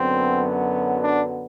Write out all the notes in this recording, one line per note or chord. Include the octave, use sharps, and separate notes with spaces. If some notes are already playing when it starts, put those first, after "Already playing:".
Already playing: F#2 D3 F#3 B3 C4
D4